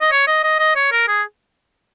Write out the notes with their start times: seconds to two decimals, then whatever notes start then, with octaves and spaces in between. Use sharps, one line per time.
0.01 D#5
0.12 C#5
0.27 D#5
0.43 D#5
0.59 D#5
0.76 C#5
0.92 A#4
1.08 G#4